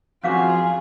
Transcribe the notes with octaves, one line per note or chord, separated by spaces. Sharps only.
F2 C#4 F4 F#4 G#4 C5 F5 D6